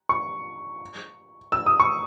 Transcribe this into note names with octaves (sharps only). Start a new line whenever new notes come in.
C#6
E6
D#6
C#6